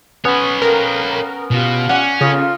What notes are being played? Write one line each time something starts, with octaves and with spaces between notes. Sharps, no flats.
B3 C#4 B4 C#5 F#5
A4 A#4 F5 G5
B2 F4 G4 F5
C#4 D5 F#5
C#3 F4 A4 D#5 C6